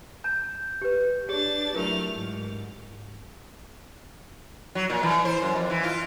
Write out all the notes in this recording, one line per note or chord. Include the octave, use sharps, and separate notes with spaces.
A#5 G6
G4 B4
D4 G4 G#4 C#5 A6
F#3 A3 E4 F4 A#4 F6
G#2
F#3
A#2
E3
C5
F#2
F2
E3
F4